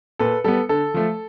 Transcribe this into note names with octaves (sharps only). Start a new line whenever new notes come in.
A#2 A4 B4
G3 B3 A4
D3 A4
F3 A3